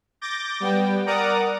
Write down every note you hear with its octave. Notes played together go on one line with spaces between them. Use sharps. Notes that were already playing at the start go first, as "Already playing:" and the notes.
D6 G6 A6 A#6
G3 B3 G5
A#4 D5 F#5 A#5 D6 D#6